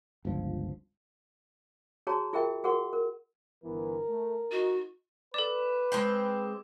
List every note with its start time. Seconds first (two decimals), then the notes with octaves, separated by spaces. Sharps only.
0.25 G1 C#2 F3
2.07 F#4 G#4 C#5 A5 A#5
2.33 F4 G#4 A#4 E5 G5
2.64 F#4 G#4 A#4 F#5 C#6
2.93 A#4
3.64 G1 E3 B3 A#4
4.08 A3
4.51 D#4 F#4
5.34 A4 B4 D5 D6
5.92 G#3 C4 G5